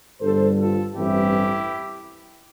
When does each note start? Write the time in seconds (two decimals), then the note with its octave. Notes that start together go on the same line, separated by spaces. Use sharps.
0.20 G1 G2 D3 A4 C5
0.58 F4 A4
0.95 A1 G2 E3 A3 C4 E4 G4